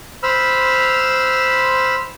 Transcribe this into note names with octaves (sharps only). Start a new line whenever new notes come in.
C5 B5 E6 F6